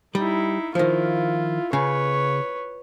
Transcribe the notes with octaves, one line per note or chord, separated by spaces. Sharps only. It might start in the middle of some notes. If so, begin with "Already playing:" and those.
G3 D#4 E4
D#3 F3 E4 F4
C#3 B4 C#5